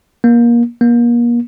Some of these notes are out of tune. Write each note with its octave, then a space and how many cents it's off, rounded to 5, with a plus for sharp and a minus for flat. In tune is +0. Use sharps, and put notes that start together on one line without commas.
A#3 +25
A#3 +35